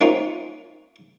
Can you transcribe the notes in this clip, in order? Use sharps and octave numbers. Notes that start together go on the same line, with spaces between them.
A#3 C4 C#4 D#4 F4